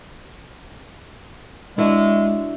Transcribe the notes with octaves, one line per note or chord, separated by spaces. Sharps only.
G#3 D4 E4 F#4